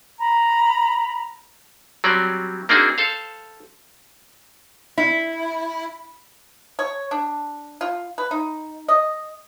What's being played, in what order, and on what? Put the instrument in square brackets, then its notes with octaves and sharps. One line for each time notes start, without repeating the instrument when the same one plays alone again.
[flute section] A#5 B5
[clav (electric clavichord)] F#3 G3 C4 C#4 D5
A#3 C4 D4 D#4 F#4 G#4
A4 C5 F5
[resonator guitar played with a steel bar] E4
[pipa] C#5
D4
F4
B4
D#4
D#5